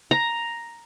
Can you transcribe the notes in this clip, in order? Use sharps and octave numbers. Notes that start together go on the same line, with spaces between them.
A#5